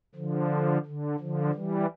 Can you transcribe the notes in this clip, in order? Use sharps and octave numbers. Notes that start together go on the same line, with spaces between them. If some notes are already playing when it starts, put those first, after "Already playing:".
D3 F3
D3
D3 F3
E3 G3